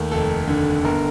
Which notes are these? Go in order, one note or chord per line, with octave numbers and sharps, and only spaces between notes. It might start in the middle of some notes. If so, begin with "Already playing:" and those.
Already playing: D#2 A3
F1 A4
D3
G1 A#4